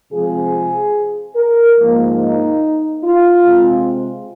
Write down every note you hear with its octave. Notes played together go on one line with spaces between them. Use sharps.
C3 F3 G#3 C4 G#4
A#4
G#2 F3 A#3
D#4
F4
C3 G#3 C4